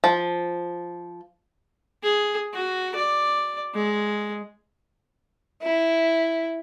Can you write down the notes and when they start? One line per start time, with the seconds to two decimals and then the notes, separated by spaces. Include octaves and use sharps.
0.04 F3
2.03 G#4
2.54 F#4
2.95 D5
3.74 G#3
5.62 E4